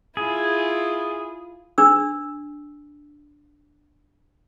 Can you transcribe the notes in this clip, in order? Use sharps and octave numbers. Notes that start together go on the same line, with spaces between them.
E4 F4 G#4
D4 E6